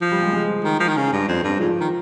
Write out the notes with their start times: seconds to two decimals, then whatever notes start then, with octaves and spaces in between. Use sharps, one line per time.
0.01 F3
0.12 G3
0.22 G#3
0.33 G#3
0.64 D#3
0.80 F3
0.88 D#3
0.97 C#3
1.13 G2
1.28 F2
1.44 G2
1.60 G#2 F3
1.81 D#3